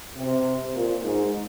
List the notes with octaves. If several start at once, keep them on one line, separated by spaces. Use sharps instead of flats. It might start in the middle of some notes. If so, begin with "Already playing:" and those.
C3
A#2
G#2